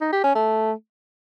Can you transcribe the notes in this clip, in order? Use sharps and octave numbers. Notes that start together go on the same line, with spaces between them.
D#4
G4
C#4
A3